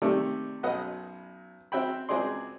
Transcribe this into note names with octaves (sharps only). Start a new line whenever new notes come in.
C3 D#3 A3 A4 D5
B1 F#2 F#3 B4 D#5 F#5
C4 F#4 E5 G5 B5
C#2 C4 F#4 G#4 D5 C6